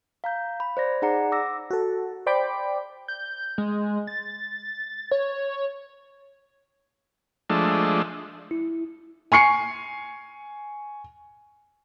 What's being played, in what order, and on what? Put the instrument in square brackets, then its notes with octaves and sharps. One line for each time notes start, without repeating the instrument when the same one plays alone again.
[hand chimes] F5 A#5 G6
B5
C5 D5 A#6
D#4 G#4 D5 F#5 A#5 C#7
D6 E6 A#6
[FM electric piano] F#4 A4
C5 D5 G5 B5 D6
[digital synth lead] G6
G#3
A6
C#5
[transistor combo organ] F3 G#3 A3 D4
[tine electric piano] E4
[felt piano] G#5 C#6 C7 C#7